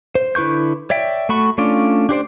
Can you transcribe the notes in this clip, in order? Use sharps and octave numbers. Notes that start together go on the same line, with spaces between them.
C5
D3 E4 B4 C#6 G6
C#5 D5 E5 G5
A3 F#4 B5 C#6
A3 C#4 D4 F4 D5
D4 G4 C5 D5